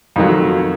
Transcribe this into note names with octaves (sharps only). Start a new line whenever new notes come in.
F2 D#3 F#3